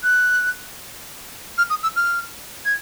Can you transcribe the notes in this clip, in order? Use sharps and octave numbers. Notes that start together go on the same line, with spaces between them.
F#6
F6
D#6
E6
F6
G#6